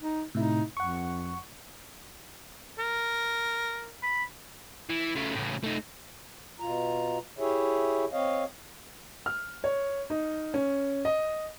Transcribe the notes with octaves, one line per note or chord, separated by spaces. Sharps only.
D#4
A2 C3 D#4 E4
F2 F#5 C#6
A#4
B5
E3
C#3 A3
A2 C#3
A3 D#4
B2 F4 A#5
E4 G4 G#4 C#5 E5
C4 C#5 D#5 F5
F6
C#5
D#4
C#4
D#5